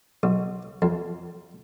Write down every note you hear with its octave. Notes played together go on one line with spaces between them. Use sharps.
B1
F2